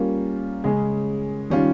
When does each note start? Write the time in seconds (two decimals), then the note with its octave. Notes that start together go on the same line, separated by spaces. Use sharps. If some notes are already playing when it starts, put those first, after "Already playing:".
Already playing: G3 A#3 C#4 F4 A#4
0.64 C#3 G#3 C#4 G#4
1.50 D#3 G3 C#4 F4